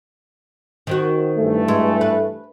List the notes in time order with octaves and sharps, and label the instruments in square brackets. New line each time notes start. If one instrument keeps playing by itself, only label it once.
[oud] D#3 C4 F#4
[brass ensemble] G2 E3 A3
[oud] G#3 E5
B4